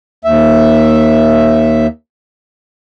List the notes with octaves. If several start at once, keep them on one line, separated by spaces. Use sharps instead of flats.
D#2 E5